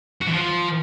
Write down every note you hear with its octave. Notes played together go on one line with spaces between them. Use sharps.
F#4
E3
F3